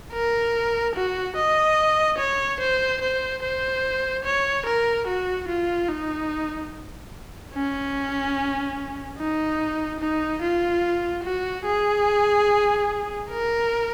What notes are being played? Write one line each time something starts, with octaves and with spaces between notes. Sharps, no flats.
A#4
F#4
D#5
C#5
C5
C5
C5
C#5
A#4
F#4
F4
D#4
C#4
D#4
D#4
F4
F#4
G#4
A#4